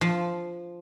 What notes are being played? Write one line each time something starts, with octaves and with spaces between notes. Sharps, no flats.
F3